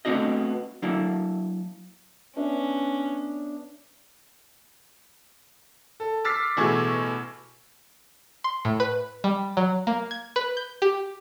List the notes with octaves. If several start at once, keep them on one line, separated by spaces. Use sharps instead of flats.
A3 B3 C4 D4 F#4 D#5
F#3 A#3 D4 E4
B3 C#4 D4 E5
A4
D6 E6 F6 A6 B6 C7
A1 B2 A3 G#4 C#6 G#6
C6
A2
B4
G3
F#3
A#3
G#6
B4
G6
G4